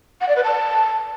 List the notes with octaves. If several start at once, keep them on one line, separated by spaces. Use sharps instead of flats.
F#5
D5
B4
A5